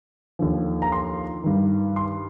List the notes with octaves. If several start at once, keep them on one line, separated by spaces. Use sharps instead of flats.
D#2 D3 F3
A#5
C6
G2 D#3
C6